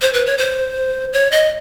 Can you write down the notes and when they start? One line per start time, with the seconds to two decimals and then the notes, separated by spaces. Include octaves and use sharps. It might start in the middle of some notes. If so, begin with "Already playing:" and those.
0.02 C5
0.13 B4
0.26 C#5
0.38 C5
1.13 C#5
1.32 D#5